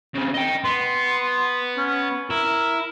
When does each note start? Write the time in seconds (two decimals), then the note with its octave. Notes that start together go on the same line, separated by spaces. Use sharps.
0.15 C#3 C4
0.34 D#5 G5
0.64 B3 C6
1.77 C#4
2.30 E4 A#4